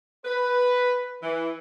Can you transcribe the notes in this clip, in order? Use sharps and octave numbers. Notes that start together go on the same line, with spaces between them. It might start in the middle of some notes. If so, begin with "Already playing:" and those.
B4
E3